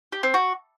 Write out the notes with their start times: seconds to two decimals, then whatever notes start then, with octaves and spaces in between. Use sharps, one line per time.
0.12 G4
0.23 C4
0.34 F#4